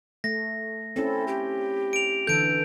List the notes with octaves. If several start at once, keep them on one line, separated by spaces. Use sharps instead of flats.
A3 A#6
C4 C#4 E4 A4
G4
D7 F7
D3 E3 A4 G6 D7